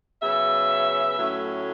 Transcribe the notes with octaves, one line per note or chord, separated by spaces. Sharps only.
C#3 F#3 B3 E5
A2 F#3 A3 C#4